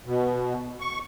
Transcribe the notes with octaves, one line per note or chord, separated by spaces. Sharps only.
B2
C#6